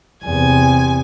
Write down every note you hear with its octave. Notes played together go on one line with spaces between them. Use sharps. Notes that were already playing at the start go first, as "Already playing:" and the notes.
E2 C3 G#5